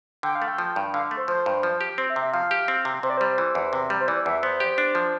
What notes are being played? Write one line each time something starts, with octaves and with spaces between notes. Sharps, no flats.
D3 G5
F5
A3
G5
F3
G2
D3 F5
A3
C5
F3 C5
G2
F3
G4
C4 C5
E5
C3
E5
F3 F5
G4
C4
C3
C3 C5
D5
G3 C5
E3
E2
C3
G3
C5
E3 D5
E2 E5
B3 C5
G4
D4
F3